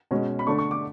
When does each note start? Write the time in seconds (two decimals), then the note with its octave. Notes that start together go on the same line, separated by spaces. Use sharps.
0.11 B2 G#3 C#4
0.39 B5
0.47 D3 A3 D4 C#6
0.58 C#6
0.71 D6